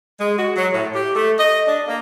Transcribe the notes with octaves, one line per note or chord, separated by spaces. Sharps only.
G#3
F#4
F#3
A2
G4
A3
D#5
D4
A#3